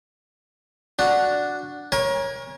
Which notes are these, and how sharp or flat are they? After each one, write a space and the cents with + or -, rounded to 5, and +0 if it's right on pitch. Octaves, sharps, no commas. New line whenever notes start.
D4 +0 F#4 -5
A#4 +30 C#5 -10 G#5 -20